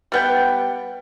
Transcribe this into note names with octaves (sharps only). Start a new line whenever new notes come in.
G3 B3 G5